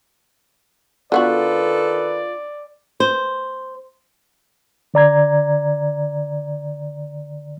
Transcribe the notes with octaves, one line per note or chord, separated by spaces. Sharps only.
D3 D#3 B3 F4 F#4 A4 B4 D5
C5
D3 D5 A#5 G#6